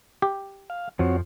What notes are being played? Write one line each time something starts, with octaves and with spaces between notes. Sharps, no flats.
G4
F5
F2 F3 C4 F#4 C#5